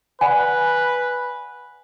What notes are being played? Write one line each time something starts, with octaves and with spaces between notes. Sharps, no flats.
B4 D5 F#5 G#5